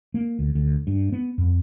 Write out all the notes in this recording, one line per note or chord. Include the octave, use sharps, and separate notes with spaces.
A#3
D2
D2
G2
B3
F2